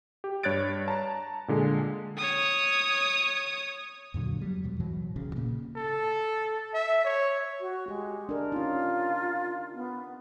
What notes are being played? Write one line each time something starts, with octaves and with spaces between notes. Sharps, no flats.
G4
G2 C#5 F#6 G#6 A6 D7
A5 A#5
A#2 D3 G#3
C#5 D#6
F2 A#2 D3 F#3
F#3 G3
D#2 B2 F3
G#2 B2 E3 F#3
E1 B1 C#3
A#2 C#3 A#3
A4
E5
C#5
F#4
G#3 G4
D4 A#4
C#4 D#4 F4
B3